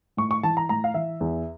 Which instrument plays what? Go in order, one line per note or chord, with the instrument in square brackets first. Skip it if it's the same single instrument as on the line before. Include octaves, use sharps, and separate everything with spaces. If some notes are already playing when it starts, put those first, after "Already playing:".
[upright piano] A2 C#6
C#6
E3 A5
A#5
A2 A#5
F5
E3 E5
E2